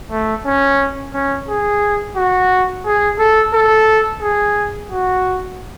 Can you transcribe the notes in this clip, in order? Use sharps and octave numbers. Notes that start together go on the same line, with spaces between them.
A3
C#4
C#4
G#4
F#4
G#4
A4
A4
G#4
F#4